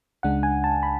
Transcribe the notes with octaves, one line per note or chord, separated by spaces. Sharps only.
C#2 C#3 G#3 D4 F#5
G#5
A5
B5